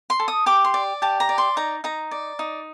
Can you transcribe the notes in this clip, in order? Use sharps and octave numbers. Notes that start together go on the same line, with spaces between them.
C6
A4
D#6
G4 D6
C6
D5
G4 A5
A#5
D5
C6
D#4 A#5
D#4 A#5
D5
D#4